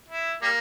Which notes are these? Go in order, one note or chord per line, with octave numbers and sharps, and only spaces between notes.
E4
G3 A#3